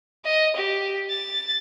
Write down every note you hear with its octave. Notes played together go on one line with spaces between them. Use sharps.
D#5
G4
A6